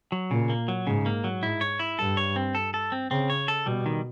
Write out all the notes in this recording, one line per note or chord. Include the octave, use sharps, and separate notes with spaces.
F#3
A#2 C#3
A#3
F#3
G#2 C#3
A#3
F#3
G#2 E4
C#5
E4
G2 A4
C#5
C4
A4
A4
C4
C#3 C4
C#5
A4
B2 G3
D#3